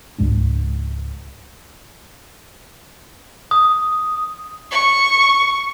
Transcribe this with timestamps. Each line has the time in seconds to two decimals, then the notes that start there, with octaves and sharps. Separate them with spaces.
0.18 C#2 G#2 G#3 D4
3.51 D#6
4.71 C#6